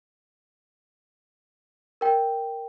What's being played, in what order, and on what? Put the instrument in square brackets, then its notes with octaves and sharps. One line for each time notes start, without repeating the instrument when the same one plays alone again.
[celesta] A#4 G5